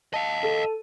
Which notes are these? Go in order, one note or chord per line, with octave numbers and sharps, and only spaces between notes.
D#5 F5 A5
A4